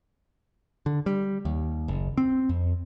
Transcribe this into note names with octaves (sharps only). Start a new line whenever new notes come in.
D3
G3
D#2
F#1
C4
F2